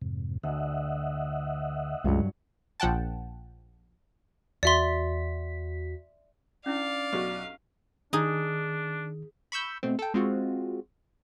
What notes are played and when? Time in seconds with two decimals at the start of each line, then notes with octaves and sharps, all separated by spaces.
0.02 F2 G#2 C3
0.43 D2 D#5 E5 F#5
2.04 C#2 G2 F#3
2.80 A#1 F3 F#5 G5 A5
4.63 E2 F#4 D5 E5 C6 B6
6.66 C#4 D4 E4 D5 F5
7.13 B1 F#3 F#4 G4 A4 C#6
8.13 D#3 D4 D#4 G#4
9.52 B5 C#6 E6 G6
9.83 B2 A3 C4
9.99 A4 G5
10.14 G#3 C4 F4 F#4